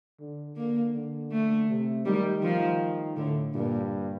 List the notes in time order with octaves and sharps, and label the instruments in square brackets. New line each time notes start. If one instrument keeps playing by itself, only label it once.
[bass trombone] D3
[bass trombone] D3 [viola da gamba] A#3
[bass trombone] D3
[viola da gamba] A3
[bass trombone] C3
[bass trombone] D#3 [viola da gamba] G3
[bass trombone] D#3 [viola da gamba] F3
[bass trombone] A2 [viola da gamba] D3
[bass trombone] G2 [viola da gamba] A#2